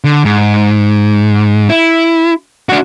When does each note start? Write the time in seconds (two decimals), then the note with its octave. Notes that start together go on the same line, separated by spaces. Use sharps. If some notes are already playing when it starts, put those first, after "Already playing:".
0.04 D3
0.25 G#2
1.70 E4
2.69 D4 F#4